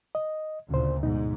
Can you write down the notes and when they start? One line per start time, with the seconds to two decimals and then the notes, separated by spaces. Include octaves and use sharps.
0.15 D#5
0.70 D2 A#2 C#3 C5
1.03 G#2 B2 D#4